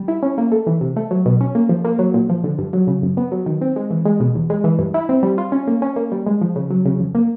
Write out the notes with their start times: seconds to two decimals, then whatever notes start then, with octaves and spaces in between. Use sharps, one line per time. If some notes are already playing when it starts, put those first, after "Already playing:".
Already playing: G3
0.08 E4
0.23 C#4
0.38 A#3
0.52 A3
0.67 E3
0.81 C3
0.96 A3
1.11 F#3
1.26 B2
1.41 C#4
1.55 A#3
1.69 F3
1.85 A#3
1.99 F#3
2.14 A#2
2.29 F3
2.44 D3
2.58 G2
2.73 F#3
2.87 C#3
3.02 F#2
3.17 B3
3.32 F#3
3.46 D#3
3.61 C4
3.76 G#3
3.91 E3
4.05 G#3
4.20 B2
4.35 E2
4.50 G#3
4.64 E3
4.79 G2
4.94 E4
5.09 C4
5.23 G3
5.38 F4
5.52 C#4
5.67 A#3
5.82 C#4
5.96 A#3
6.12 G3
6.27 G#3
6.41 F3
6.56 C#3
6.71 F#3
6.85 C#3
7.00 F2
7.15 A#3